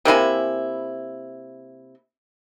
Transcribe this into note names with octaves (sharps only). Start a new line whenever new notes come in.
C3 A#3 E4 G#5